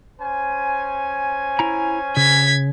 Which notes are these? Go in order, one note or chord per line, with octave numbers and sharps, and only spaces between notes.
C#4 C5 G#5
E4 A#5
C#3 G#6 B6